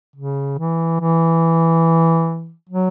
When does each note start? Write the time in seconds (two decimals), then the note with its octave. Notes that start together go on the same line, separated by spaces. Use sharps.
0.16 C#3
0.58 E3
1.01 E3
2.69 F#3